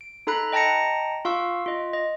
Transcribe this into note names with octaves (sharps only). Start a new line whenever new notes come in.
D7
D#4 A4 A#5 B5 F#6
D#5 G5 A5 A#5 A#6 C#7
F4 F5 C#6 E6
F4 D#5
D#5